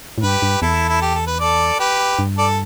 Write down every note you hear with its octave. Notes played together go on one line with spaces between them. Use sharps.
A2
G2 G4 B4
G2
E2 E4 A4
E4
G4
A4
B4
A4 D5
G4 B4
G2
A4 D5